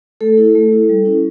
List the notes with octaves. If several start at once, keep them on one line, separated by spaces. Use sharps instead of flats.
A3 A4
E4
A3
E4
G3
C#4 E4